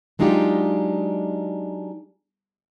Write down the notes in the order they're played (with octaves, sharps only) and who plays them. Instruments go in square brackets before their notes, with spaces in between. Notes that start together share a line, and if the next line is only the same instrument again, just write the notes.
[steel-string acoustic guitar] F#3 G#3 D4 D#4 F4 G4